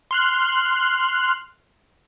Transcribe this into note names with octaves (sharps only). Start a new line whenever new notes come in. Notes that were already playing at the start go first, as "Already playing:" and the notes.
C6 F6 F#6